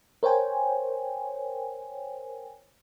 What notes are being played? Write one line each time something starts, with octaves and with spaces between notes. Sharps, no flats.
A#4 C5 C#5 G5 G#5